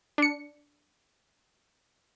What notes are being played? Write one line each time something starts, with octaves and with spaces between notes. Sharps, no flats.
D4 C#7